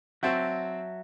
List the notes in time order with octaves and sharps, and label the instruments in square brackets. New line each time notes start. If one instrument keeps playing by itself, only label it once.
[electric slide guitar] F#3 E5 A5 [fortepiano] C4 F#4